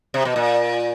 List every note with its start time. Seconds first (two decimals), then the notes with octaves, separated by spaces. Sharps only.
0.14 C3
0.25 B2
0.36 A#2